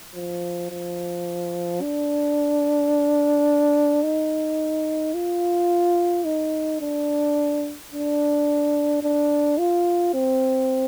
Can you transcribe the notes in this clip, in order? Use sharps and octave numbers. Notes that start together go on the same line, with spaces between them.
F3
F3
D4
D#4
F4
D#4
D4
D4
D4
F4
C4